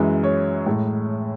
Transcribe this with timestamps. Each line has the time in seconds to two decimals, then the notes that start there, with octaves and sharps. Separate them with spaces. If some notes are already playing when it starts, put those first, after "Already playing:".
Already playing: F#2 E3 G#3
0.24 C#5
0.66 A2 G#3